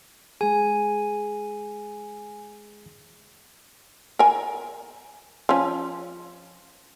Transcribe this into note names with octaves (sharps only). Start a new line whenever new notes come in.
G#3 G#4 G#5
A#4 G#5
F3 C#4